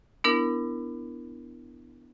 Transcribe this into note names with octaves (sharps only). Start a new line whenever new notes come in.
B3 D4 E4 A#4